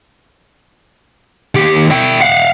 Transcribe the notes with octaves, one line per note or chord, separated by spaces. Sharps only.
D#2 G4
E4 G5
F5 F#5